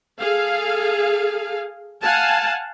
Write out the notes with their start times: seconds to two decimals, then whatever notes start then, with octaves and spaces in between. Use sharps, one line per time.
0.20 G#4 A4 F5
2.02 F5 F#5 G#5 A5